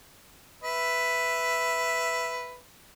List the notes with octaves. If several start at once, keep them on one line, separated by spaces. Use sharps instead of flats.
B4 E5